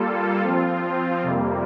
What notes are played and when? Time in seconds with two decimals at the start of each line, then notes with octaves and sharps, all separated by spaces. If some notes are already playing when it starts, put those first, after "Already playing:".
Already playing: G3 A#3 F4 A4
0.41 F3 C4 F4
1.23 F2 C3 G3 A#3